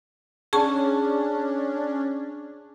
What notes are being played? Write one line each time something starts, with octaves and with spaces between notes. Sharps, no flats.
C#4 D4 G#4 A5 C#6